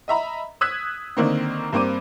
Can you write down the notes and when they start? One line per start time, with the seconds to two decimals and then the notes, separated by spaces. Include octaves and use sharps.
0.08 D#5 E5 A#5 B5
0.61 D#6 E6 F#6 G#6 B6
1.17 D3 D#3 A#3 C4
1.73 G2 A#3 C4 D6 D#7